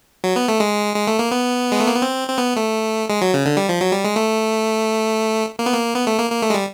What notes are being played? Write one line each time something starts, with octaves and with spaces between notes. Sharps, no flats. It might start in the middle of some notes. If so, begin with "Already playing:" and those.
F#3
B3
A3
G#3
G#3
A3
A#3
B3
G#3
A3
A#3
B3
C4
C4
B3
A3
G#3
F#3
C#3
D3
G3
F3
F#3
G3
G#3
A3
A#3
B3
A#3
B3
A3
A#3
A#3
A3
G#3
G3